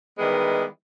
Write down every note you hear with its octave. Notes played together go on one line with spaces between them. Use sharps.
D#3 E3 G3 G#3 B3